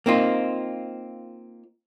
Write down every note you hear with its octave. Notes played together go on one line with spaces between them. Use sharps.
A#3 C4 D#4 F4